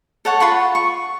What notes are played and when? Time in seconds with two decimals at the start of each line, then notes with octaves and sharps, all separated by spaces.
0.25 A4 C#5 F#5 A5
0.40 F4 F#5 B5 C#6
0.75 C#6